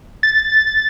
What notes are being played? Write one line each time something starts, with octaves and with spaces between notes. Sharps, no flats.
A6